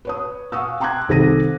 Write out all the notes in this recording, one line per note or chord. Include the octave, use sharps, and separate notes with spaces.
B4 C#5 D#6
F5 F#5 G#5 C#6 D#6 E6
G5 A#5 C6 D6 F#6 G#6
C2 D#3 A4 C5 A#6 D#7